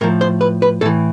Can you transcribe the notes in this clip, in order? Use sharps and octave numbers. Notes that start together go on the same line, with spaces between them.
A2 F3 A#4
C5
B4
B4
A2 E3 A4